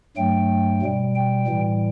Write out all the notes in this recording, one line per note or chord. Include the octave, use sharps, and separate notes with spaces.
G2 F#3 A3 G5
B2 G3
G5
A2 E3 G3